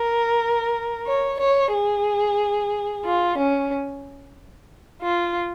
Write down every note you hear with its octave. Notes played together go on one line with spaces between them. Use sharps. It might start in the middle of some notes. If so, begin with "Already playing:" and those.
Already playing: A#4
C#5
C#5
G#4
F4
C#4
F4